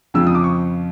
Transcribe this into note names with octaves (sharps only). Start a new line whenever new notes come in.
F2 C#3 F3 E6
D#6
D6
C#6